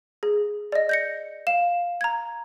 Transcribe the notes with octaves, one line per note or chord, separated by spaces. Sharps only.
G#4
D5 D#5
G6 A#6 C#7
F5 E7
A#5 G#6